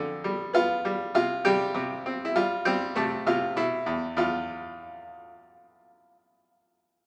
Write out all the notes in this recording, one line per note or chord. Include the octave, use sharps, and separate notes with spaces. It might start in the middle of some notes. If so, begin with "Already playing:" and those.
Already playing: F2 D3
G3
B3 F4
G3
C3 F4
C3 G3 G4
C3
C4
E4
G3 F4
G3 C4 G4
C3 A3 A4
C3 F4
B2 E4
E2
E2 F4